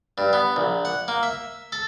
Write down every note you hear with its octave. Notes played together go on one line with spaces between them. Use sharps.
G2
B3
A#1
F#5
A#3
E5
A4